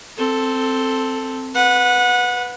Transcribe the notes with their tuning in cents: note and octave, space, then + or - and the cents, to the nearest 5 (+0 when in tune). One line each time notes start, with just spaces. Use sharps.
C4 +0 A4 +5
B4 +0 F#5 -25